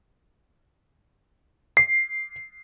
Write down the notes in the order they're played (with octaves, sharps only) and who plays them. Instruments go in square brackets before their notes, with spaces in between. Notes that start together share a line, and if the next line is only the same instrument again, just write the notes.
[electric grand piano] C7